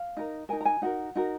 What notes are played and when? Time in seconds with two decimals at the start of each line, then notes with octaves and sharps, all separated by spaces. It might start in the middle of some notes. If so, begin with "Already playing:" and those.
Already playing: F5
0.17 D#4 A#4
0.49 D#4 A#4 G#5
0.61 A#5
0.65 G#5
0.82 D#4 F#4 A#4 F#5
1.15 D#4 F#4 A#4